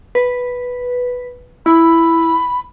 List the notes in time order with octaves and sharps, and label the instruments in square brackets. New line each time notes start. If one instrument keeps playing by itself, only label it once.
[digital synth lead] B4
[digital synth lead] E4 [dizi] B5